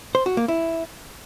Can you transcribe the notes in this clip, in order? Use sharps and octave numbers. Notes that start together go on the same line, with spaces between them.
C5
F#4
A#3
E4